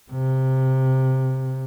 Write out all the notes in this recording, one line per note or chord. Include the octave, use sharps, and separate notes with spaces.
C3